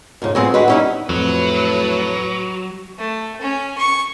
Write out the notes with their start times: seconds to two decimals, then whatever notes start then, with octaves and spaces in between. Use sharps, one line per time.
0.22 F2 G#2 C#3
0.35 A2 F3 F#3 G#3 B3 C4
0.54 D3 G#3 F#4 B4
0.68 G3 B3 C#4 D#4 E4
1.09 F2 A2 F#3 B4
2.98 A3
3.41 C#4
3.78 C#6